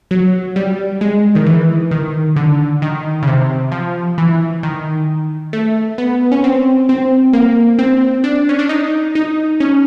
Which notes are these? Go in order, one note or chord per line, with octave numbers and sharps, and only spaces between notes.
F#3
G3
G#3
D#3
E3
D#3
D3
D#3
C#3
C3
F3
E3
D#3
A3
B3
C#4
C4
C4
A#3
C4
D4
C#4
D4
D#4
D#4
C#4